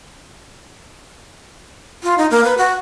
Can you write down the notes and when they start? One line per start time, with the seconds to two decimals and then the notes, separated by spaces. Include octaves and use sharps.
2.03 F4
2.18 D#4
2.31 A#3
2.44 B4
2.58 F#4